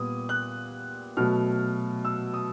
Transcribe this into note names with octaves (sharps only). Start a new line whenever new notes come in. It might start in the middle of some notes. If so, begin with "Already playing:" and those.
Already playing: A#2 G3 B3 D#6
F#6
B2 F#3 A3 F6
E6
D#6